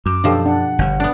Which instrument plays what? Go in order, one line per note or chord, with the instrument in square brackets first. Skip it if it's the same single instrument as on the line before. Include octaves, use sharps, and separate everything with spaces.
[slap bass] F#2 [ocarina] D6
[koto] B2 F3 [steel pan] D4 G4 A4
[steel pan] D4 [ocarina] F#5
[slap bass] G1 G2
[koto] B3 D4